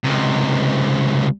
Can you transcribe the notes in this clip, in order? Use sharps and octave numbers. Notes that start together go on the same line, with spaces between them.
C#2 C3